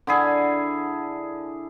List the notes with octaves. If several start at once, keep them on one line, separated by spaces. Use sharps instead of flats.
D3 E4 G#4